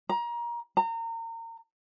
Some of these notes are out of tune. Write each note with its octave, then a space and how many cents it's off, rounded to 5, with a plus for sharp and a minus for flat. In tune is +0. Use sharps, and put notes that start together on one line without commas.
A#5 +25
A#5 -30